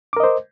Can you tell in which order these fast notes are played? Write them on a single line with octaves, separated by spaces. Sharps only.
D6 A#4 D#5 C5